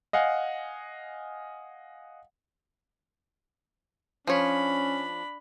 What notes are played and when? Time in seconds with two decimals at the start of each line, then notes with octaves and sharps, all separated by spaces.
0.13 D#5 F5 F#5 G#5
4.27 F3 C#4 D4 C#5 B5